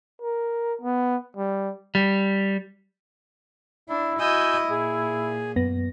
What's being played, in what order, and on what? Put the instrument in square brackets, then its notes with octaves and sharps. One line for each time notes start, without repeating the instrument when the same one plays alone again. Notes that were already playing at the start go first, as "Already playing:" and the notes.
[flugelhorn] A#4
B3
G3
[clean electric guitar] G3
[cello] D4 [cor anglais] E4
[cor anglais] E4 [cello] F#4 D#5 [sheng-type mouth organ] G#5 E6 G6
[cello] A#2 [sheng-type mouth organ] G#4
[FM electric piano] F#2 B3 A#6